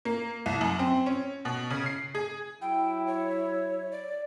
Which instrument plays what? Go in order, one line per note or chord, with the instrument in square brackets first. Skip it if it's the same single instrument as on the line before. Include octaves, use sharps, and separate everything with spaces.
[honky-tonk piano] A#3
C2
F#2
C4
C#4
B2
C#3
C7
G#4
[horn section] F#3 E4 [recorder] G5
[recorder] C#5
D5